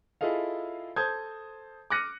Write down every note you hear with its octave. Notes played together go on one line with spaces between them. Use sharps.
E4 F4 G#4 A4 D#5 F5
A4 C5 A5 D#6 G6 G#6
D6 F6 F#6 A#6 C#7 D#7